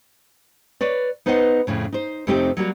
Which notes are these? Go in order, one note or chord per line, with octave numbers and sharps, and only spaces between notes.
B4 C#5 D5
B3 D#4 B4 C5 D#5 F#5
F2 A2 C#3
D#4 C5
F2 C3 A3 C4 D#4 G4
F#3 G3 A#3 F#4